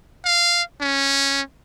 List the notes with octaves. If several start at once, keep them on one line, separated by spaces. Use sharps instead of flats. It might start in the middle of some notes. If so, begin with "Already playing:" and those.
F5
C#4